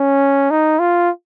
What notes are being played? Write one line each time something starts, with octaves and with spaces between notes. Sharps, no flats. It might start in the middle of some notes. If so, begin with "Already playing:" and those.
Already playing: C#4
D#4
F4